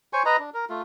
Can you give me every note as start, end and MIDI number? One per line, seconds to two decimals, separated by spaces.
0.13 0.23 72
0.13 0.23 73
0.13 0.23 80
0.13 0.23 85
0.25 0.37 71
0.25 0.37 75
0.25 0.37 82
0.39 0.50 62
0.54 0.65 70
0.70 0.82 57
0.70 0.82 65